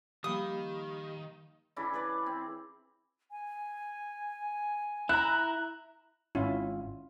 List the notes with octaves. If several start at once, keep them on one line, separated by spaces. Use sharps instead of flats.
D#3 F3 G3 A#3 G4 F5 B5 D#6
C#3 E3 D4 E4
G#4 B4 D5
C4
G#5
E4 A#5 F#6
G#1 C#4 E4 F4